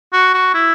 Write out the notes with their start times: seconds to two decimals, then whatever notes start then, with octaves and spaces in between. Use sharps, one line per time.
0.13 F#4
0.34 F#4
0.54 E4